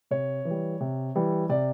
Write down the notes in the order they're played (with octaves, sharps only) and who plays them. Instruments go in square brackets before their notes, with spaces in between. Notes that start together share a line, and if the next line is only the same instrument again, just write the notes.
[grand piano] C3 C#5
E3
G3
C3
E3 G3
C3 D5